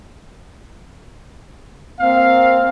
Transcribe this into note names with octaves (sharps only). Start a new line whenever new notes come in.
A#3 C4 F5